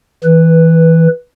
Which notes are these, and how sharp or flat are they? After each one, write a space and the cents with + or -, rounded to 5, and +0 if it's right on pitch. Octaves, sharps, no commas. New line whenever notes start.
E3 -15 B4 +0